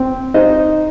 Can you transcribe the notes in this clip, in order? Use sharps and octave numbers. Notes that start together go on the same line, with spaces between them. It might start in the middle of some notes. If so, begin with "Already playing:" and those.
Already playing: C4
D#4 C5 D#5